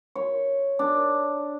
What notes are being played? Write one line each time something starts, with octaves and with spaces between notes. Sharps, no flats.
C#5
D4